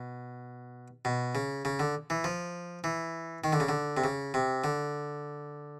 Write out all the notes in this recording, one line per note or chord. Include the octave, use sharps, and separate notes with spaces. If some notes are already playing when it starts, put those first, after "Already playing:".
Already playing: B2
B2
C#3
C#3
D3
E3
F3
E3
D#3
D3
C#3
D3
C3
C#3
C3
D3